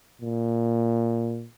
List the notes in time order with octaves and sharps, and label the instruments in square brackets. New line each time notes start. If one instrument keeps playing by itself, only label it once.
[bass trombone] A#2